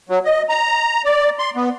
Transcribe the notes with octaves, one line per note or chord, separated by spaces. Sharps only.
F#3
D#5
A#5
D5
C6
B3